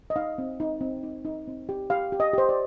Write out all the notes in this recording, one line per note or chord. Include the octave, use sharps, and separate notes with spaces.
D#5
D#4 F5
C4
D#4
C4
D#4
D#4
C4
G4
G4 F5
G4
D#5
G4 C5
D5